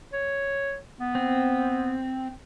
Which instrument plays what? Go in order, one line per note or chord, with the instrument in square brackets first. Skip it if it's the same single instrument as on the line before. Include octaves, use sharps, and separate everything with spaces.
[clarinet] C#5
B3
[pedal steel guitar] C4